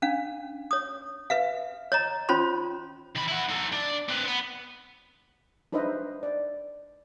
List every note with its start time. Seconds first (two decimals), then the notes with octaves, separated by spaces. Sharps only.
0.02 C#4 D4 F5
0.71 C#5 D#6
1.30 B4 E5 F5
1.92 C#5 D#5 A#5
2.29 C#4 F4 C5 C#5 B5 C6
3.15 D#3 B5
3.28 E4 F#5
3.49 D#4 A4
3.72 D4
4.09 C4 B4
4.27 B3
5.72 D4 D#4 B4 C5 D#5 E5
6.23 D5